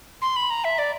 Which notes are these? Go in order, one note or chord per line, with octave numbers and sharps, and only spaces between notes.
C6
B5
A#5
E5
D5